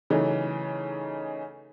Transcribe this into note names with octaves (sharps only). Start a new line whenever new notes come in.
C#3 E3 F#3 A3 D#4